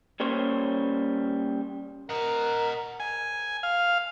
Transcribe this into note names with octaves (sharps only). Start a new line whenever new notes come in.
G3 A#3 C#4 C5 C#5
A#4 D#5 F#5
G#5
F5